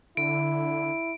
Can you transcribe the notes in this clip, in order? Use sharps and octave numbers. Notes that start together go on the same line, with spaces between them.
D3 E4 D7